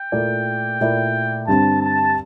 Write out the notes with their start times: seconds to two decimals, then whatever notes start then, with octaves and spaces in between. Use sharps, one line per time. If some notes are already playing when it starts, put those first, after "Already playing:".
Already playing: G5
0.12 A#2 A3 E4 A#4 D5
0.81 A#2 A3 E4 A#4 D5
1.47 G2 D3 G3 C4 A5
1.82 A5